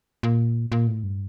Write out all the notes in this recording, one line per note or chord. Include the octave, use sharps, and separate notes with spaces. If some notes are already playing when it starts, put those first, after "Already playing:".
A#2
A#2
A2
G2